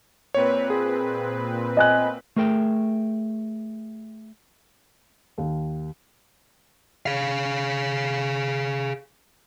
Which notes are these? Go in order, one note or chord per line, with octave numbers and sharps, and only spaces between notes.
A#2 C4 B4 C#5
G#4
D#5 G#5 F#6
A3 G#4 A#4 E5 G5
D#2
G#4 F5